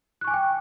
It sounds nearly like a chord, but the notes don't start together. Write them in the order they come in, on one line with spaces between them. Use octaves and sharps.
F#6 C#6 G#5 D6 G5